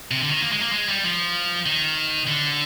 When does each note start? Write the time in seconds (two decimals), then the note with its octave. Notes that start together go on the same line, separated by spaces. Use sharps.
0.11 C3
0.21 D3
0.31 D#3
0.42 A#3
0.52 G#3
0.62 A#3
0.72 G#3
0.89 G3
1.04 F3
1.66 D#3
2.27 D3